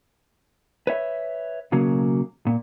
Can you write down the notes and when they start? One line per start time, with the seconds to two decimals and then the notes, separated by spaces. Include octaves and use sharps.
0.87 B4 C#5 E5
1.72 B1 C#3 F#3 A#3
2.47 A#2